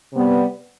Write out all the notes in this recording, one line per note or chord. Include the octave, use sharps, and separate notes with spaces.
C3 G3 B3